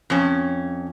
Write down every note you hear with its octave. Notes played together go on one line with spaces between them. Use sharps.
F2 C#4